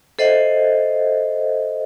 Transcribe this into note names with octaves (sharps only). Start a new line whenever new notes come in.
A4 C5 D#5 E5 F#5